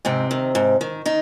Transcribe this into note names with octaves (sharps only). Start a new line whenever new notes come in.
G#2 C3 C4
D#3
G#2
D#3
D#3 D#4